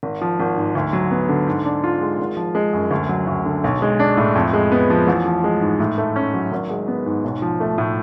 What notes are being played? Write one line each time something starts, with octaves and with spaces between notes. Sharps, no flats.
G#1
F3
G#1
G#2
D2
F#3
B3
D3
G#2
D4
F4
G#3
G#1
F3
G#3
F#2
D2
F#3
D2
D3
B1
G#3
D4
A2
F2
G#3
B3
F3
A1
F3
G#3
G#2
A2
A3
C#4
F#3
G#1
G#3
B3
G#2
B1
F3
A3
A2